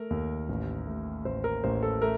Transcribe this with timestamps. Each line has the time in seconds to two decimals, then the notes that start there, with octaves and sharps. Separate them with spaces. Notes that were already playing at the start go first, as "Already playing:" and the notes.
Already playing: A3 A#4
0.10 D#2
0.49 A1
0.87 A2
1.25 A1 C5
1.44 A#4
1.64 A1 C5
1.83 A4
2.02 A3 A#4